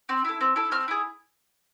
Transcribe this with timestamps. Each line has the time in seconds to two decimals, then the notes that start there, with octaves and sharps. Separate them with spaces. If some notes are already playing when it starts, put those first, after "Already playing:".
0.09 C4
0.25 E4 A4
0.41 C4
0.56 E4 A4
0.71 C4 F6
0.88 E4 G#4